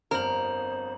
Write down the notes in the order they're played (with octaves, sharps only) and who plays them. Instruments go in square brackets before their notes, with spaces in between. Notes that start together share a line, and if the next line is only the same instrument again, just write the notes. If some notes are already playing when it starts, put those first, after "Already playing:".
[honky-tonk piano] G1 F2 [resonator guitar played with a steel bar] A#4 [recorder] C5 [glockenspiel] A#5 F#7